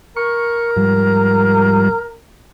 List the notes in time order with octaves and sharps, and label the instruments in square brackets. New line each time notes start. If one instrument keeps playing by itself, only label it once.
[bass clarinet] A#4 [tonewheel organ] C#6
[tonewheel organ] G#2 F3 G3